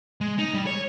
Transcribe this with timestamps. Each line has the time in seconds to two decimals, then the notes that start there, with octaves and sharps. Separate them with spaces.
0.21 G#3
0.38 D#4
0.54 G3
0.67 C#5